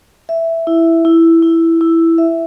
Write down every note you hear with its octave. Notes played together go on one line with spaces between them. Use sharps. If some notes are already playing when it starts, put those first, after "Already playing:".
E5
E4
E4
E4
E4
E5